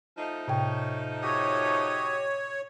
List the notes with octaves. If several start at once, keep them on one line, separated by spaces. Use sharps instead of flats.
F3 A3 D#4
A2 C3 C#5 G5
F#4 G4 C#5 D#6